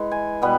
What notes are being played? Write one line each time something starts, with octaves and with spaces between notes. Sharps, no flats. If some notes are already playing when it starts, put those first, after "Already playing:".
Already playing: E3 G#3
G#5
B2 G3 B3